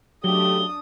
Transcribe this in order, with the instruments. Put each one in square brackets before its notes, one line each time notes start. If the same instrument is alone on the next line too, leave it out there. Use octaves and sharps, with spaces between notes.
[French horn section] C#3 A3 G4 [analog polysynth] F#3 [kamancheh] D4 D#6 [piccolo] G7